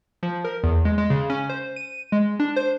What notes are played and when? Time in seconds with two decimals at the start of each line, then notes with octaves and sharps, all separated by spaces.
0.23 F3
0.44 A#4
0.64 E2
0.85 G#3
0.98 G#3
1.10 C#3
1.30 C#4
1.49 C5
1.76 D#7
2.12 G#3
2.40 D4
2.56 C5